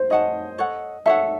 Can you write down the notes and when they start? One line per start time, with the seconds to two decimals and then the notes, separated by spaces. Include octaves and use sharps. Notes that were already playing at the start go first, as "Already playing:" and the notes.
Already playing: C5
0.10 G#4 C#5 D#5 F#5 A5
0.58 A4 C#5 F#5
1.06 A4 C#5 E5 F#5